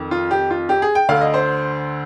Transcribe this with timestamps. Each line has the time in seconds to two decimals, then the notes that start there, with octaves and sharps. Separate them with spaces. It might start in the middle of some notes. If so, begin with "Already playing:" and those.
Already playing: F2 D#3
0.11 F4
0.31 G4
0.51 F4
0.69 G4
0.82 G#4
0.95 G5
1.09 D2 D3 F5
1.21 D#5
1.34 C5